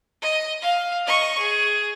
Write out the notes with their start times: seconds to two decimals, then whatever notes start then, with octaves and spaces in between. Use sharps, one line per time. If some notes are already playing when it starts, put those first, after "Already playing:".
0.22 D#5
0.62 F5
1.06 D#5 C#6
1.39 G#4